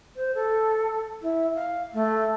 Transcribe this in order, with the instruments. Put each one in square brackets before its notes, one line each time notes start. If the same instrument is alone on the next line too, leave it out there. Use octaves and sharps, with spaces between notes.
[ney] C5
A4
E4
F5
A3